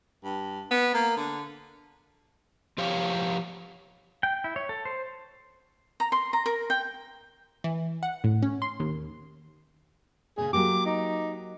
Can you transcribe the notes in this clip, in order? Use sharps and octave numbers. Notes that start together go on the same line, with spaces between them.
G2
B3
A#3
D3
F3 G4 C#5 F5
G5
E4
C#5
A4
C5
A#5
C6
A#5
A#4
G5
E3
F#5
A2
C#4
C6
D#2
A#2 C#3 G#4
F#3 A#3 G4 D6
D#4